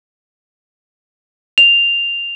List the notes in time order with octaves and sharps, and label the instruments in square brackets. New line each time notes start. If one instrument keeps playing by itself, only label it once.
[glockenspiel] F7